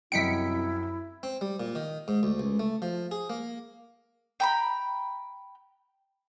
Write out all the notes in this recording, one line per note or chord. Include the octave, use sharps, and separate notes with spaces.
C2 F#2 E4 D#5 G5 B6 C#7 D7
C4
G3
A#2
D#3
G#2
D2
C#2
A3
F3
G#4
A#3
G5 A#5 B5